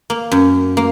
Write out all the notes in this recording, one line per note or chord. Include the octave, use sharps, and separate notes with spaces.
A#3
F#2
A#3